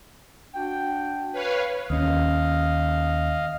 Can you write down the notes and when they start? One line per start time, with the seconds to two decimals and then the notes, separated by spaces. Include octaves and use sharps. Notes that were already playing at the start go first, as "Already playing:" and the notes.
0.54 D4 F#4 G5
1.32 B4 C#5 F5
1.90 D#2 C#4 D#5 F5